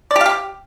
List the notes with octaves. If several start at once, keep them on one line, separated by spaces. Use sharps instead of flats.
D5
G4
F5
G4